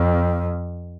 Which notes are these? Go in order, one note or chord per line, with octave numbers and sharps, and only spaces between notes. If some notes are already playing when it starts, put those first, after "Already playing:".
Already playing: F2